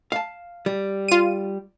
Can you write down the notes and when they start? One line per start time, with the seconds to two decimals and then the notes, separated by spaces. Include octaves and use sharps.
0.12 F5 A5
0.66 G3
1.08 F4 D#7